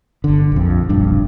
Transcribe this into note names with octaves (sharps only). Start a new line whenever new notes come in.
G1 D3
A#1 F2
E1 A#1 G2 D4